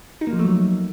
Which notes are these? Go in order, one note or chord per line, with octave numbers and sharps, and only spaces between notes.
D#4
A#3
F3
A3
F#3